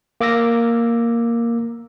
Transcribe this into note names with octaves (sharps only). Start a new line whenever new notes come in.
A#3 D6 E6 A#6